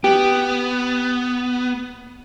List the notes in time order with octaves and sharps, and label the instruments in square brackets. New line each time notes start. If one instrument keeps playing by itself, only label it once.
[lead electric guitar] B3 [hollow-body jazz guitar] G4